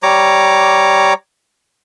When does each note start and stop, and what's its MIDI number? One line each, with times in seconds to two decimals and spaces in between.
0.03 1.14 55
0.03 1.14 73
0.03 1.14 82
0.03 1.14 86